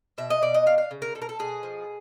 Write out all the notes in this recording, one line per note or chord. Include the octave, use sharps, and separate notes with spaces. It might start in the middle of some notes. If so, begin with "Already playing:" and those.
B2 E5
D#5
B2 D5
D#5
D4 F5
F5
C#3
A#4
B2 A4
A#4
A4
B2 G#4
F3